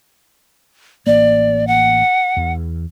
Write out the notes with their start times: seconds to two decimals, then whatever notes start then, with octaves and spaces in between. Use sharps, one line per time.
1.07 A1 A#3 D5
1.67 F#5
2.37 E2